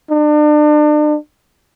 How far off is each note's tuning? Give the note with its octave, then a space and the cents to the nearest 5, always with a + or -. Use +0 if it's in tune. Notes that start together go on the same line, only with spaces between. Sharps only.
D4 +35